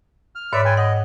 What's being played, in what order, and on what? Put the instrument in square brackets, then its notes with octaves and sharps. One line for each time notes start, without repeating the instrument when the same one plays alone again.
[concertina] F6
[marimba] G#2 C#5 [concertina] B4 D5 E5
[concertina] B4 G5 G#5
[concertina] D#5 [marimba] F#5